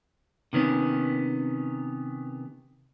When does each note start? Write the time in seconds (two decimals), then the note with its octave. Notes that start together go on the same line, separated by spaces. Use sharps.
0.53 C3 D#3 B3 C#4